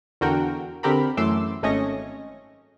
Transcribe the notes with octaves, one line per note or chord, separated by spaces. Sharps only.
E2 D3 F#4 A#4 G5
D3 C4 G4 A#4 B5
F#2 E3 A3 C6 D6 E6
G#1 A3 C#4 D#5 C#6 A#6